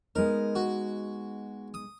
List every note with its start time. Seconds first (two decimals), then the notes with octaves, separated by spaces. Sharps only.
0.15 G#3 B3 D#4 A#4
0.55 F#4
1.74 D#6